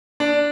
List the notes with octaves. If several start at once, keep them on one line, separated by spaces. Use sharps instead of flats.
D4